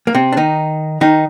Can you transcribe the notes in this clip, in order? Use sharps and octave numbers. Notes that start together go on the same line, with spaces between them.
A#3
C3 C4
D4
D#3 D#4
D#3 D#4